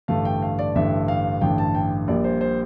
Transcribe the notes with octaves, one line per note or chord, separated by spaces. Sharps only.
A1 G2 D3 A3 F5
G5
F5
D5
A1 G2 D3 A3 E5
F5
A1 G2 D3 A3 G5
A5
G5
A#1 A#2 G3 D5
C5
C5